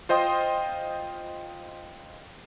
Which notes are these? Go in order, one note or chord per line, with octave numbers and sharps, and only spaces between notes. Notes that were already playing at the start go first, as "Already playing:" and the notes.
F4 C5 D#5 G5 C6 D#6